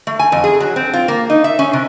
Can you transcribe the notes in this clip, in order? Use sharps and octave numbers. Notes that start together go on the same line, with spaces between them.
A3
G#5
F2
G#4
F#3
C4
F4
A#3
D#4
E5
C#4
C3